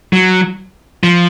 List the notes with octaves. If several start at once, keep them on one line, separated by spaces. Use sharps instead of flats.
F#3
F3